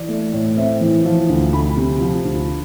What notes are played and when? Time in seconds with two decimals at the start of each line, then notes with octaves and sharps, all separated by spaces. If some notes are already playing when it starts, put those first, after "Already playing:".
Already playing: E3 D5
0.09 A3
0.33 A2
0.57 C4 E5
0.81 E3
1.05 F3
1.29 D2
1.53 D2 B5
1.77 C3
2.01 F3
2.25 D2